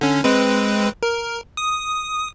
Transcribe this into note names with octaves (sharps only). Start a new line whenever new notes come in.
D3 C#4
G#3 C4 B4
A#4
D#6